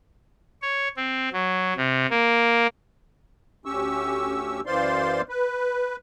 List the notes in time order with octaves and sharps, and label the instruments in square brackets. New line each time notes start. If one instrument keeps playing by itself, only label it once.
[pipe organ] C#5
C4
F#3
C3
A#3
[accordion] D2 C#4 G4 C#6 E6
F#2 E3 C5 D5 F5 C6
B4